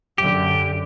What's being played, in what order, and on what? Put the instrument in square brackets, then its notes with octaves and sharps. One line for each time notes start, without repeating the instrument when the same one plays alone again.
[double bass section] F#2 D3 [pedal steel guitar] G4